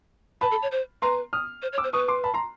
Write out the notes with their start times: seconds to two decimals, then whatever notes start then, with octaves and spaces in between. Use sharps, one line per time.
0.41 B4 A5 B5
0.51 A4
0.62 C#5
0.72 C5
1.02 B4 A#5 C6
1.33 D#6 F6
1.62 C5
1.73 C#5
1.78 D6 E6
1.84 C5
1.93 B4 C#6 D#6
2.08 C6 D6
2.24 A5 B5
2.34 A#5 C6